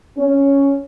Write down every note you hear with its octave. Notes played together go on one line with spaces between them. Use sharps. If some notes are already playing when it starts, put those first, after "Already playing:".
C#4